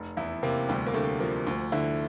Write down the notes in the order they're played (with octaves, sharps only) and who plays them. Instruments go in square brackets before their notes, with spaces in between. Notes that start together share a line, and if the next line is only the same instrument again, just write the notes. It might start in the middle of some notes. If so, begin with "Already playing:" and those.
Already playing: [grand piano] F1
E2 E4
C3 A#3
D2 G3
A#3
D3 A3
F3 A#3
D2
D3 E4